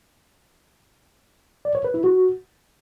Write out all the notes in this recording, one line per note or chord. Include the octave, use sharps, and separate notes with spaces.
D5
C#5
B4
E4
F#4